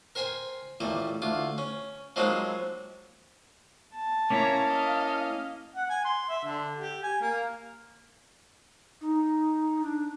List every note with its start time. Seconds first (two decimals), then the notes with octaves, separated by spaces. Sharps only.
0.15 A#4 C5 G5 G#5 C6
0.80 A1 A#2 G3 A#5
1.22 D2 F4
1.58 C#4
2.16 F3 F#3 G#3 A#3 C4 D#4
3.95 A5
4.30 A#3 C#4 E4 C#5 A#5
4.64 D#5 F5
5.76 F#5
5.89 G#5
6.05 C6
6.29 E5
6.43 D3
6.77 G4
7.03 G#5
7.21 A#3
9.01 D#4
9.83 D4